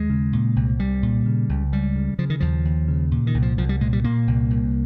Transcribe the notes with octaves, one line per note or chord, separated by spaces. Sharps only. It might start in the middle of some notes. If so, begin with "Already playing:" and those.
Already playing: D#2 G#3
C#3
A#2
C2
C2 G3
A#2
C#3
C#2
C#2 G3
C#3
C#3 F3
D#3
D#2 F3
D#2
C#3
A#2
D#3
C2
F3
C2 F3
G3
A#2 G#3
G3
A#2 A#3
C2
C2